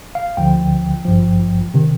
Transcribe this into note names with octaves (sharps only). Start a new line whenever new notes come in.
F5
D2 D3 F3 G5
G#1 G2 F3
C3 D#3